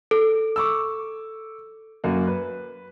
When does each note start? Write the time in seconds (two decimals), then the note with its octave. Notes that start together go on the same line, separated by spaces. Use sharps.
0.11 A4
0.56 C#6 D6 E6
2.04 F#2 A#3 F#4
2.27 B4